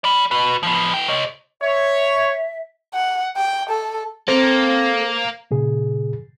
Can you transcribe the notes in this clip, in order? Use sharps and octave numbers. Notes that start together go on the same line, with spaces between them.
D5 B5
F#4 B4
F3 B3
B3 G5
C#5 D#5
C#5 E5
F#5
G5
A4
A#3 C4 A4 C5
A#2 C#3 G#4